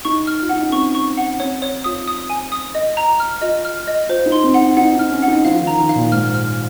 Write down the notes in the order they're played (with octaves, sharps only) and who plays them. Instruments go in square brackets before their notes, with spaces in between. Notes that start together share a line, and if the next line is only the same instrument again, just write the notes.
[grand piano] D#4 [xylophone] C#6
[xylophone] F6
[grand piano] F4
[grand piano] D#4 [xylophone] F#5
[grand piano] C#4
[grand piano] C4 [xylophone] C#6
[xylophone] C#6
F#5
[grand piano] C4 [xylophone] C#5
[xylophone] C#5
[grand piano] F4 [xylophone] D#6
[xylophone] D#6
G#5
D#6
D#5
A#5
F6
[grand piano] F4 [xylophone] D#5
[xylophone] F6
D#5
[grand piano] F4 [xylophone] C5
[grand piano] D#4
[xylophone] C6
[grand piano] C4
[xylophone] F#5
[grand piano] D#4
[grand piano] D#4 [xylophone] F#5
[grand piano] D#4
[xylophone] F6
[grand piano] C#4
[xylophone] F#5
[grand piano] D#4
[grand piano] F3 [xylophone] F5
[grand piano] D#3
[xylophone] A#5
[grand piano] D#3
[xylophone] F5
[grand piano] A#2
[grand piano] G#2 [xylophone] F6
[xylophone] F6